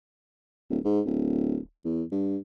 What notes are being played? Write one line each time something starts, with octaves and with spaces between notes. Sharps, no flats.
D1
G#2
D1
E2
G2